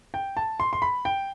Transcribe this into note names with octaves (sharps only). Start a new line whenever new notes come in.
G5
A5
C6
C6
B5
G5